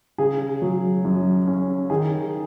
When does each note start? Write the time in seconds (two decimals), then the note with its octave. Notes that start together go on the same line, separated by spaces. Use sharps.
0.18 C#3 G#4
0.62 F#3
1.05 F#2
1.47 C#4
1.90 D#3 G#4